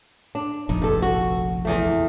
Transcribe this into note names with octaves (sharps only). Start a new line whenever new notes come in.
D4
F1 A#1 D#4
G2 A4
F#4
E2 A3